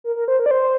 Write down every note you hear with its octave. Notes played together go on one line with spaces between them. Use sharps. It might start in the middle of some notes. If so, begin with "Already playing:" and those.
A#4
A#4
C5
A#4
D5
C5